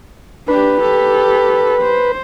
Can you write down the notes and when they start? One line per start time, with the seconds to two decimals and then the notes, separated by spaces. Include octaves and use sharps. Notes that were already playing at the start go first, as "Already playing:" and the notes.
0.48 D4 G4 B4
0.81 G4 A4
1.82 C5